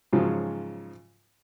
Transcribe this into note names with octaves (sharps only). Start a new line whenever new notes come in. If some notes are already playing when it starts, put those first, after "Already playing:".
G#2 C#3 F3 F#3